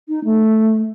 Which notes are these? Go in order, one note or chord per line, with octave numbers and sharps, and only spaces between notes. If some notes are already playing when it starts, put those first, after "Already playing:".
D#4
A3